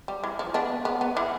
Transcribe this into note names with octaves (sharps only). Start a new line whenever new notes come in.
G3
E3
F3
B3 D4
B3
B3
E3